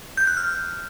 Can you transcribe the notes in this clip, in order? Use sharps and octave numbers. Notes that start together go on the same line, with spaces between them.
G6
F#6
F6